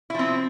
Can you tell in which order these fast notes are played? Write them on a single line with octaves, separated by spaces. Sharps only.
E4 F3 C4